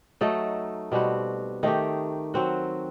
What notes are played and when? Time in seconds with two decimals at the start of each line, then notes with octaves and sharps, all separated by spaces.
0.21 F#3 A3 D#4 A4
0.92 B2 G3 C4 F#4
1.63 D#3 A3 D#4 G4
2.34 F#3 C4 F#4